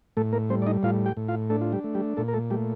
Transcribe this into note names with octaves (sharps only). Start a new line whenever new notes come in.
A2 A3 A4
A#3 A#4
G3 C4 C5
D5
D#4 D#5
A2 F4 F5
G4 G5
A2
F4 F5
A3 D4 A4
F4
G3 G4
A3
G3 G4
A#2 A3 A4
A#4
A3 A4
G3 A3 G4